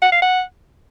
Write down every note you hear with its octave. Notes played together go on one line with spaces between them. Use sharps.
F#5
F5
F#5